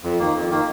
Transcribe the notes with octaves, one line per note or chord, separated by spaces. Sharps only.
F2
D#3 A#3
F2
D#3 A#3